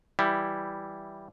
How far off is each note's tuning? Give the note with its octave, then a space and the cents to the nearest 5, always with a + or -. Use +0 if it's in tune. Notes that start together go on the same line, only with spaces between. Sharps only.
E3 +0 G3 -5 E4 +0